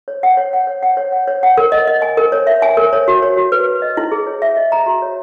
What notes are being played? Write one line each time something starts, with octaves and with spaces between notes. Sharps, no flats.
C#5
F#5
C#5
F#5
C#5
F#5
C#5
F#5
C#5
F#5
A#4
D#5
D#5
G#5
A#4
C#5
E5
G#5
A#4
C#5
F#4
C#5
F#4
B4
B4
D#5
E4
G#4
C#5
E5
D#5
A#5
F#4
C#5